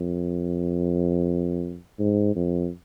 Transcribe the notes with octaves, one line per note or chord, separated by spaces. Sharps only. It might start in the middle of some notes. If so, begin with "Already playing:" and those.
Already playing: F2
G#2
F2